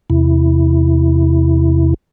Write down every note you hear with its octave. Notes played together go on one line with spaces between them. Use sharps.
E2 C3 E4